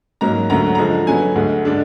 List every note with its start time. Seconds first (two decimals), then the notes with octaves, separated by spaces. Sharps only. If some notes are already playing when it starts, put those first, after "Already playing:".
0.21 G#2 F#3 A#3 D#4 A#5
0.50 D2 D3 F#3 A#5
0.75 D3 F3 G#3 A#5
1.07 D3 F#3 B3 G#5
1.36 D2 D3 G#3
1.65 D3 G#3 D4